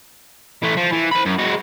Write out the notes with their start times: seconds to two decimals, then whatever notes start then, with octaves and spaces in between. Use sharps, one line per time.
0.62 E3 A3
0.77 F3
0.92 E3
1.12 C5 B5
1.26 F#2
1.39 G#3 F#4